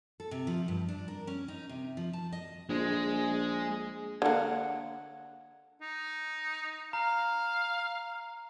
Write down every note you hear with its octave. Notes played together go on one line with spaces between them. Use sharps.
A4
C3
F3
G2
D4
A#4
C#4
D#4
C3
F3
A5
D#5
A#1 G#3
D3 A#3 C#5 F#5
D#4
F5 A#5